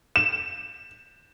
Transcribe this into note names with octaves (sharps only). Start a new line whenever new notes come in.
E7